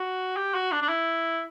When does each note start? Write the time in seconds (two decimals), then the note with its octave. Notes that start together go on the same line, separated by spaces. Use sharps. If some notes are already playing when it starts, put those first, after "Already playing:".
Already playing: F#4
0.36 G4
0.54 F#4
0.72 D4
0.82 D4
0.89 E4